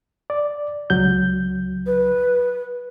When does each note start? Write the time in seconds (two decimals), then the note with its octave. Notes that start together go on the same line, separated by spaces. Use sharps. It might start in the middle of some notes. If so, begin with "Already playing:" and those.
0.30 D5
0.90 C#2 F#3 G6
1.86 B4